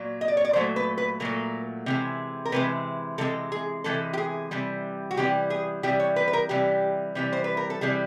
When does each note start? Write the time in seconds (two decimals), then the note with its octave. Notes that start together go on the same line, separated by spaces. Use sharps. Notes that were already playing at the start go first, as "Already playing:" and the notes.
Already playing: A#2 F#3
0.21 D#5
0.28 D5
0.37 C#5
0.45 D5
0.53 A#2 F#3 A3 C5
0.76 B4
0.98 B4
1.20 A#2 F#3 A3 A#4
1.86 C3 E3 G#3
2.45 A#4
2.52 C3 E3 G#3 B4
3.18 C3 E3 G#3 A4
3.52 G#4
3.84 C3 E3 G#3 A4
4.13 G4
4.18 G#4
4.51 C3 E3 G3
5.11 F#4
5.17 C3 E3 G3 G4
5.50 G#4
5.83 C3 E3 G3 G4
6.00 C#5
6.16 B4
6.28 B4
6.33 A#4
6.49 C3 E3 G3 G4
7.15 C3 E3 G3
7.33 C5
7.44 B4
7.57 A#4
7.70 A4
7.81 C3 E3 G3 G#4